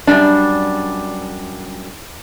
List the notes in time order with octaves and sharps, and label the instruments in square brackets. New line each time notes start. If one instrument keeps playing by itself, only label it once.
[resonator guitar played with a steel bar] F#2 C3 G3 D4